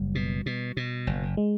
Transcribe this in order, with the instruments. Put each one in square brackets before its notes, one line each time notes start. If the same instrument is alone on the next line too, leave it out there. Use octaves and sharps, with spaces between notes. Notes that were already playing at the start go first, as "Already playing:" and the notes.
Already playing: [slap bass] F#1 [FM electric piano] G3
[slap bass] B2
B2
B2
F#1
[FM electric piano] G#3